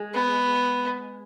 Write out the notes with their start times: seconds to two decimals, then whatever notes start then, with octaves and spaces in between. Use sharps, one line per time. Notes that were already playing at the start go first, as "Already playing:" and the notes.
Already playing: G#3
0.14 B3